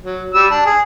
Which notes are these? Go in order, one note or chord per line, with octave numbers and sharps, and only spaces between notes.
F#3
G3 E6
D4
G#4